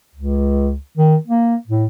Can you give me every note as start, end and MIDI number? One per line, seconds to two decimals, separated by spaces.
0.15 0.75 37
0.97 1.16 51
1.27 1.56 58
1.67 1.86 45